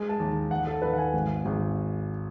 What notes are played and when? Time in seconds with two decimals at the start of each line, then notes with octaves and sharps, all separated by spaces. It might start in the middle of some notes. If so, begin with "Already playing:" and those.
Already playing: G#3
0.09 A5
0.20 D#2
0.51 D#2 F#5
0.67 A4
0.82 D#2 B4
0.93 F#5
0.98 G#5
1.13 G#1
1.45 G#1